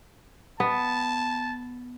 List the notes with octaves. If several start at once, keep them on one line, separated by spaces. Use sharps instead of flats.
B3 A5